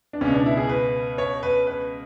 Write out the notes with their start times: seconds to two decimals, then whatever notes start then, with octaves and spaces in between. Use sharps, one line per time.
0.13 D4
0.21 C#2 B2 C#4
0.34 D4
0.46 E4
0.57 G#4
0.69 B4
1.18 C#5
1.43 B4
1.67 B4